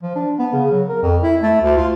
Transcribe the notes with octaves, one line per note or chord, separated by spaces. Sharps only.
F3
D4
B3
C#3
F#3
A#4
F2
E4
A3
D2
F4